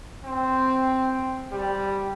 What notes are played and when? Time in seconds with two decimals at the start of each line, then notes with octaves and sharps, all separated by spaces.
0.24 C4
1.51 G3